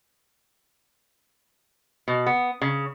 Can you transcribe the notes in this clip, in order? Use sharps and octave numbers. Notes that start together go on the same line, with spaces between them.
B2
B3
C#3